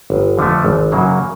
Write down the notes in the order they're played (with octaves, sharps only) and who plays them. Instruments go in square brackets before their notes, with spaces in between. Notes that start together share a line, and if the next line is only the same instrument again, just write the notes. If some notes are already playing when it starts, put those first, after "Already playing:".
[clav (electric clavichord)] G1
F2 D3 F3 A3
G#1
F#2 C#3 F#3 A#3